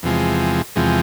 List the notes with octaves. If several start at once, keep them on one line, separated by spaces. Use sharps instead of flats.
E2 C3 F3 G#3
E2 C3 F3 G#3